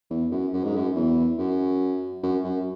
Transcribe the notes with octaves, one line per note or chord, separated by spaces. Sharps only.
E2
F#2
F#2
G#2
F#2
E2
F#2
F#2
F#2